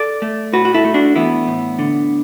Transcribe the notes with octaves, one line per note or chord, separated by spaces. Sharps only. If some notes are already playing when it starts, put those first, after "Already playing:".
Already playing: A4 D5
A3
A2 F#4 B4
F#4
E4 A4
A3
D4 F#4
E3 B3 E4
A2
D3